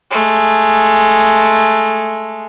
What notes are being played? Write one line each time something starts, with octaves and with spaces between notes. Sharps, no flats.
G#3 A3